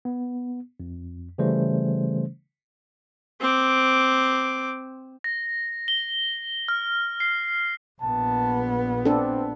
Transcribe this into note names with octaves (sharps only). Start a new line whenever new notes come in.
B3
F2
C#3 E3 G3 A3 C#4 C5
C4 D6
A#6
G7
F6
C7
A#1 B3 A5
C4 D4 A4